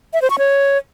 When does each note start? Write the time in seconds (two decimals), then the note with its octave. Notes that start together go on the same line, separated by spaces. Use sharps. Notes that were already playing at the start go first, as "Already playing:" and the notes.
0.13 E5
0.22 C5
0.30 C#6
0.39 C#5